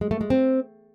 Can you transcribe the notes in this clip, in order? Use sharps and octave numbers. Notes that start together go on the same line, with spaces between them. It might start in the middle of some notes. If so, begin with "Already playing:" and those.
G#3
A3
G#3
C4